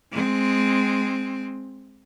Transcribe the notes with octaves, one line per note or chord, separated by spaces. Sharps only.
G#3 C4